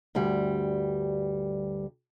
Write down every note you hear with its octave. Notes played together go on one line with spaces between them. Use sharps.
D2 G2 G3